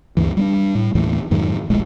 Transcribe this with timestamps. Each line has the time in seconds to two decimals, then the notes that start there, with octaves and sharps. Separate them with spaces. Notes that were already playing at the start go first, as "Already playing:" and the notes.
0.17 D2 G2 E3
0.37 G3 A3 D4
0.75 A2
0.95 D#2 A2 E3 A3
1.31 F2 G#2 D#3 F#3
1.70 D#1 A#1 A2 G#3